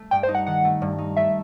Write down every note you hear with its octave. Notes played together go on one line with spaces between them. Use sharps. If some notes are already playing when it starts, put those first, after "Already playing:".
Already playing: A3
G2 G5
C5
D#4
F#5
D#3 F#5
A3
G2
D#4
A3 E5